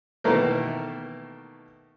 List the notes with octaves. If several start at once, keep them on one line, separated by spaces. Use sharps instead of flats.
B2 D#3 E3 A3 A#3